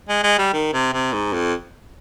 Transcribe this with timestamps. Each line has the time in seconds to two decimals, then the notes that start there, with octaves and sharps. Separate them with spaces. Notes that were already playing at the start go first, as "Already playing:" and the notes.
0.09 G#3
0.24 G#3
0.38 G3
0.53 D#3
0.73 C3
0.93 C3
1.13 G#2
1.33 F2